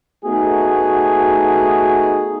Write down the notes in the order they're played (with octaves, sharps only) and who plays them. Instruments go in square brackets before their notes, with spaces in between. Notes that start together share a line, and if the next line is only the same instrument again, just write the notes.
[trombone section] A3 B3 D#4 F#4 G#4